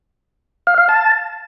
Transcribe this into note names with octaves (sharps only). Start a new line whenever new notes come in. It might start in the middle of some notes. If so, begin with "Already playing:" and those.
F5
F5
A5